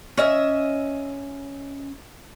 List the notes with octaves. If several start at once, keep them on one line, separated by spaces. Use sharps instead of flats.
C#4 D#5 E5